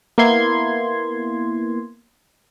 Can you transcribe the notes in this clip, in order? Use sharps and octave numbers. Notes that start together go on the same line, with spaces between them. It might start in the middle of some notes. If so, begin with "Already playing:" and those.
A#3 B3 E4 C6 G#6